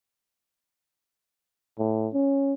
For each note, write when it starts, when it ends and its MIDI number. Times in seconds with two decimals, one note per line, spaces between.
1.79 2.07 45
2.14 2.53 61